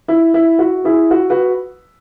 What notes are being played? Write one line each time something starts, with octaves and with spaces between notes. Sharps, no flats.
E4
E4
F#4
E4 G#4
F#4
F#4 B4